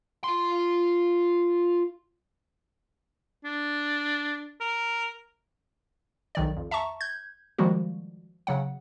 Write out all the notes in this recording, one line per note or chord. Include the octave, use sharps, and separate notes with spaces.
F4 C6
D4
A#4
B1 D#3 D5
F2
E5 A5 A#5 C#6
G6 G#6
D#3 F3 G3 G#3 A#3 F#4
C#3 F#3 F#5